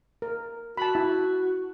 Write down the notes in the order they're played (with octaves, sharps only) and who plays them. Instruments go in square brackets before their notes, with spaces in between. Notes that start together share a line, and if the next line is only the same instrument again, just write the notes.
[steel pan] A#4
[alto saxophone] F#4 [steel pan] A5 B5
[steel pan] E4